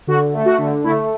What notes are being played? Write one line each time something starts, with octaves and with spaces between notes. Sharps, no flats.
D3 F#4
A3
F#4
D3
A3 E4